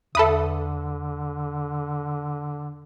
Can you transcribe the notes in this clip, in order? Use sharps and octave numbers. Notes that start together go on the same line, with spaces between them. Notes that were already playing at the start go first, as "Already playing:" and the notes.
E2 D3 A4 B4 E5 D#6